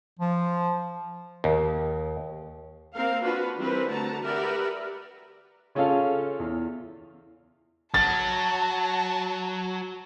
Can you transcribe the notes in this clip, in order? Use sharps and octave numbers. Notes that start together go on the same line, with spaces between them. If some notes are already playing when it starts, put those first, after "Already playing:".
F3
D#2
A#3 C4 A#4 F5
D4 F4 F#4 B4
E3 G3 C4 A#4 B4
D3 A3 F#4 A5 A#5
G4 A#4 B4 D5 E5 F#5
C#3 C#4 F4 A4 F5
E2
F#3 A5 A6